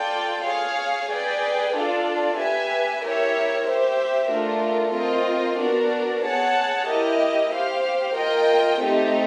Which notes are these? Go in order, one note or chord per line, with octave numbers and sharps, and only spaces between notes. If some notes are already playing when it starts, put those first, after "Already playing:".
Already playing: F4 A4 D5 G5
G#4 C#5 F5
G#4 B4 D5 G5
D4 F4 A4 D5
G4 B4 E5 G#5
E4 G4 A#4 C#5 E5
G4 C5 E5
A3 D4 F4 A#4
C4 F4 A#4 D#5
B3 D4 F#4 A#4 D5
G#4 C#5 F#5 A5
E4 G4 A#4 D#5
G4 C5 F5
F4 A#4 D#5 G5
A3 C4 D#4 G4